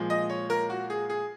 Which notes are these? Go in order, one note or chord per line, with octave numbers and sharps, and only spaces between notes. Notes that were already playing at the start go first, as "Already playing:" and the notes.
Already playing: A#2 F3 G#3
D#5
C#5
A#4
F#4
G#4
G#4